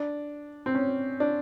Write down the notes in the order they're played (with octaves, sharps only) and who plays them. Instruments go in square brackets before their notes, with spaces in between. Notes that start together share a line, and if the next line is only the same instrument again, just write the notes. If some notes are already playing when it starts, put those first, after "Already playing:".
Already playing: [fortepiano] D4
C4
C#4
D4